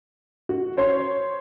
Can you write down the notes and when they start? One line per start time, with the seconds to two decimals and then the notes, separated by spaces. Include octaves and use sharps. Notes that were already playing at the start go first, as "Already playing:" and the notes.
0.49 F#4
0.77 C#4 C5 C#5 C6